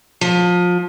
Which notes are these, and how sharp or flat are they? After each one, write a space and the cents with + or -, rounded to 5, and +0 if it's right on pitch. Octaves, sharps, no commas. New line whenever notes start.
F3 +25